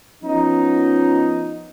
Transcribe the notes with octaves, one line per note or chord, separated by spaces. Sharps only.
F3 B3 C#4 D#4